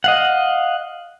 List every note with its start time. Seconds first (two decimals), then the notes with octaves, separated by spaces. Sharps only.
0.04 D#5 F5 F#5